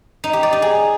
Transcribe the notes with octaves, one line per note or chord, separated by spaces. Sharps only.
D#4
G4
D5
D#4
G#4